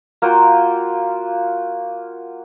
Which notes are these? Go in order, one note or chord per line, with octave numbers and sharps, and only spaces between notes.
A#3 F4 F#4 G5